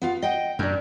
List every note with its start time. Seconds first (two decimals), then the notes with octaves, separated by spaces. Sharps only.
0.02 B3 F4 F5
0.22 D#5 F#5 G5
0.59 F#2 D4 A#4